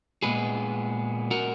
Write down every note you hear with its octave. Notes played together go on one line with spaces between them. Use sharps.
A#2 G#3 B3 G#4 B4
F#4 A#4